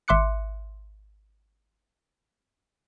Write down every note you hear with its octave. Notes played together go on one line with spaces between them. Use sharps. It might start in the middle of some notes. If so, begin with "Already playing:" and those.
G#1 E5 C6 D6 F#6 C#7